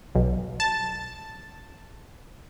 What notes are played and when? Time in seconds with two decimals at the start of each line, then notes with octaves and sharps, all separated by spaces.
0.15 B1
0.60 A5